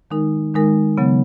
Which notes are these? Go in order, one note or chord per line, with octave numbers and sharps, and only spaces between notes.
D#3 G#3 D#4 A#4
D#3 G#3 D#4 A#4
C#3 F#3 B3